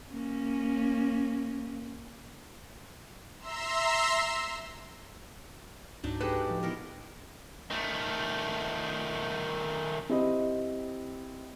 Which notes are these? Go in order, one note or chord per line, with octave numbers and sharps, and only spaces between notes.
A#3 C#4
E5 A#5 C6 E6
C#2 G#2 F#3 D4 D#4
G#3 F#4 G4 A4 B4
A2 F3
E3 B3 A#4
D#3 A3
C4 E4 G4 D#5